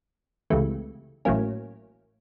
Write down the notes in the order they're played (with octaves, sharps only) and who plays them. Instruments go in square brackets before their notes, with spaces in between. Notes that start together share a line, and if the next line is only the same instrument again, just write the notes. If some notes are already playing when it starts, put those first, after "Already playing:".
[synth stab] C#2 C3 E3 A3
A1 A2 F#3 A#3 C#4